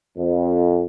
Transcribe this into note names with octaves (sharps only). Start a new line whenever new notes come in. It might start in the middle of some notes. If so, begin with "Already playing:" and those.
F2